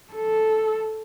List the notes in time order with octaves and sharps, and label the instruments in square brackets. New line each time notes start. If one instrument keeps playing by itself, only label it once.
[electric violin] A4